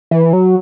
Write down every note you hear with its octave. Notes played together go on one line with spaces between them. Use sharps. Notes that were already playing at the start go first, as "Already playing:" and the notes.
E3
F#3